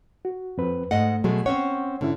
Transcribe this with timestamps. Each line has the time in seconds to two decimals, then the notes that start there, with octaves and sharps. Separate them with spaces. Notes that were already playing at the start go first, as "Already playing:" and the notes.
0.25 F#4
0.58 F2 C4 B4
0.91 G#2 A3 D#5 F#5
1.24 B2 F#3 G#3 A3
1.46 C4 C#4 C#5 F#5
2.01 G#2 D3 C#4 E4